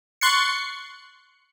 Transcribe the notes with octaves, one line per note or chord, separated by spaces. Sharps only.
C6 C#6 F#6 A6 C7 C#7